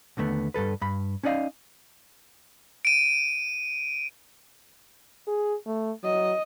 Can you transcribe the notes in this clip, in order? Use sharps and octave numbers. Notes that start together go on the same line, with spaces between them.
D#2 D3 A3 B3
G2 C3 A4 B4
G2 B5
C#4 D#4 D5 D#5 F5
D7 D#7
G#4
A3
F#3 D#5